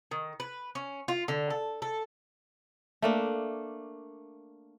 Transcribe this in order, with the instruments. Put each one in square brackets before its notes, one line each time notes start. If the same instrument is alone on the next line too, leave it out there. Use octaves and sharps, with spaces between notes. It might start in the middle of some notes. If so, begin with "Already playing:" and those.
[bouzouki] D#3
B4
C#4
F4
D3
A4
A4
[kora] A3 A#3 D4